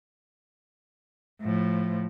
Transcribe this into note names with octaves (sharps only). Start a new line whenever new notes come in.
A2 F3